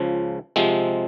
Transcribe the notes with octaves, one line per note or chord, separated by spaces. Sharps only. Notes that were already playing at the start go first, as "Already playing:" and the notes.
Already playing: C#2 C#3 F3
C3 F3 G#3 C4